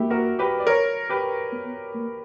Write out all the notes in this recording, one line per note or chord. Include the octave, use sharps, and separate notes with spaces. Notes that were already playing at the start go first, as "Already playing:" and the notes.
Already playing: A#3 E4 F#4 G4
F#4 A#4
G4 B4
D5
A#4 C#5
G4 B4
B3
A#3